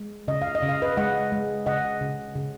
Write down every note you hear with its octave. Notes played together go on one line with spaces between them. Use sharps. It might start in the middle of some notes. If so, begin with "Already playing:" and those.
Already playing: G#3
C#3 D#5
F5
D#5
C#3
F5
B4 D#5
G#3 D#5 F#5
G#3
C#3 D#5 F#5
C#3
C#3